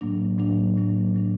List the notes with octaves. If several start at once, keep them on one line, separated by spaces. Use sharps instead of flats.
A2 F#3 A#3 D4
A2 F#3 A#3 D4
A2 F#3 A#3 D4
A2 F#3 A#3 D4